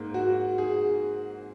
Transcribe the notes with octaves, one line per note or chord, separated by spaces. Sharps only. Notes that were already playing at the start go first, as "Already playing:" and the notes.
Already playing: G#2 A#3
F#4
G#4